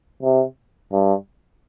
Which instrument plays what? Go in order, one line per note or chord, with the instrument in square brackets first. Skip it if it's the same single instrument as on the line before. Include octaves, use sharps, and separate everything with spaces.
[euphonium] C3
G2